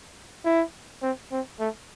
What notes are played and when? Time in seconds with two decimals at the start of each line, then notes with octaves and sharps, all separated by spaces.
0.45 E4
1.03 C4
1.32 C4
1.60 A3